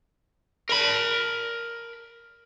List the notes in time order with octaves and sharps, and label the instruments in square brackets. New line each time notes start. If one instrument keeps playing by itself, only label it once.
[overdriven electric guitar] A#4 B5